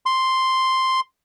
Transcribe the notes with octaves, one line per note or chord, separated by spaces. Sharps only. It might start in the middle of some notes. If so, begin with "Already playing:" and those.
C6